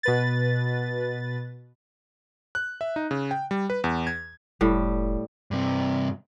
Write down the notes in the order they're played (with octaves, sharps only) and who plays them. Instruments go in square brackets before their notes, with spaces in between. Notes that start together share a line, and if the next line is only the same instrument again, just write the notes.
[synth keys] B2 B4 A6
[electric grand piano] F#6
E5
D#4
C#3
G5
G3
B4
E2
G#6
[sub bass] F1 [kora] A2 G3
[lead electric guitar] G2 C3